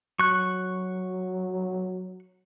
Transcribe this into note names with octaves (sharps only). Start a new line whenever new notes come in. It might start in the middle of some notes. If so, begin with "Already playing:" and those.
F#3 C#6 F#6